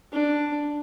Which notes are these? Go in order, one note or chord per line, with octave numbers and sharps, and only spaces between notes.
D4